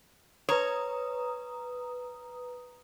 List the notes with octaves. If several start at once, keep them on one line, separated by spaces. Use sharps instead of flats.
B4 C#5 A#5 D#6